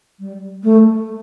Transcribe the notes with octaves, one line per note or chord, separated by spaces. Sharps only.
G3
A3